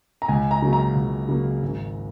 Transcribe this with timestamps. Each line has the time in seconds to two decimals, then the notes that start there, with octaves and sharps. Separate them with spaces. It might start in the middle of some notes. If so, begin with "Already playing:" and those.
0.22 A#5
0.28 C#2 G#5
0.51 A#5
0.62 C#3 F#3 A#3
0.73 A#5
0.96 C#2
1.28 C#3 F#3 A#3
1.62 G#1